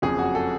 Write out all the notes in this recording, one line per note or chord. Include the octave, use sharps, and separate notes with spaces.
F#1 F2 C#3 F3 G#4
F#4
A4